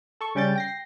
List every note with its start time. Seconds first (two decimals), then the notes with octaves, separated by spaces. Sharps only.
0.21 A4 C#6
0.35 C#3 G3 C#4 G5 G6 A6
0.55 G5 A#6 C7